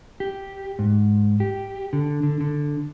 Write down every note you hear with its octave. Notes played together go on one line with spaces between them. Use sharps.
G4
G#2
G4
D3
D3
D3